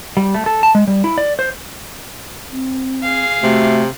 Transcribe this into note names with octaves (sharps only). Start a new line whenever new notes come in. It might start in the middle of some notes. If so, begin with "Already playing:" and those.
G3
A3
A4
A5
G#3
G3
E4
D5
C5
C4
G#4 F5
C3 A3 F#4